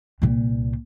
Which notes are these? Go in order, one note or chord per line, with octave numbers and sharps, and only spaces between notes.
C2 A#2